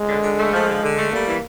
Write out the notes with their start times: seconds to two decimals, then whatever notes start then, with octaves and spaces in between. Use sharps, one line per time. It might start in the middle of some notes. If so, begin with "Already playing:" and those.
Already playing: G#3
0.08 D3
0.23 D3
0.38 A3
0.52 F3
0.67 D3
0.83 D3
0.97 A3
1.12 G3 A#3
1.26 E3